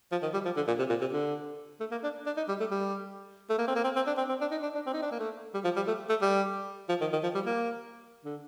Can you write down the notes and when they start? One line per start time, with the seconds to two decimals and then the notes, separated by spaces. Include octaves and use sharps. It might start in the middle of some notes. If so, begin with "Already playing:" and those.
0.11 F3
0.22 D#3
0.33 G3
0.45 F3
0.56 D3
0.67 A#2
0.79 C3
0.89 A#2
1.01 C3
1.13 D3
1.80 A3
1.91 A#3
2.03 D4
2.26 D4
2.37 D#4
2.48 G3
2.60 A3
2.71 G3
3.49 A3
3.58 A#3
3.68 C4
3.75 A#3
3.84 C4
3.96 C4
4.07 D4
4.17 C4
4.29 C4
4.41 D4
4.51 D#4
4.62 D4
4.75 D4
4.86 C4
4.93 D#4
5.02 D4
5.11 A#3
5.19 A3
5.54 G3
5.64 F3
5.76 G3
5.87 A3
6.09 A3
6.21 G3
6.89 F3
7.01 D#3
7.12 D#3
7.23 F3
7.35 G3
7.46 A#3
8.25 D3